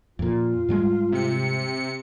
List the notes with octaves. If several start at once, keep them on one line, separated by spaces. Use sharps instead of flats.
F2 A#2 F4
G#2 G3 G#3
C3 C#7